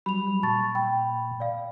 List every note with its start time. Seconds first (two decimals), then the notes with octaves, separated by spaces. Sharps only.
0.06 F#3 G3 B5 F7
0.43 A#2 A5 C#6 A6
0.75 G5 B5
1.40 D5 F5